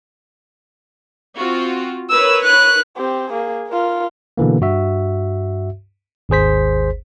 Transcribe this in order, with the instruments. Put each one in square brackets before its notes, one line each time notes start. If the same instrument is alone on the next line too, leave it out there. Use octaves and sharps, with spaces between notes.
[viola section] C4 F4 F#4
[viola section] A#4 B4 C#5 [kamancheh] E6
[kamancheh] F#6
C4 G4
A#3 G#4
F4 A#4
[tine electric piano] B2 D3 E3 A#3
G2 F#4 E5
G#1 D#2 G#4 C5 B6